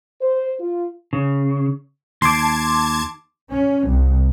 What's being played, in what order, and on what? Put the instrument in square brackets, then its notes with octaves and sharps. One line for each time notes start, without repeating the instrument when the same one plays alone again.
[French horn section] C5
F4
[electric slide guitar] C#3
[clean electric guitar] D#2 [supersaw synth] A5 G#6 [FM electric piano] C6 D6
[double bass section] C#4
C2